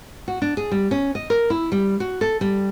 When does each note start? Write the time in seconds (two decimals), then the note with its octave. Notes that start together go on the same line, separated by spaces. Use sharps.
0.28 F#4
0.42 D4
0.57 G#4
0.71 G3
0.91 C#4
1.15 D#5
1.30 A#4
1.50 E4
1.72 G3
2.00 F#4
2.21 A4
2.41 G3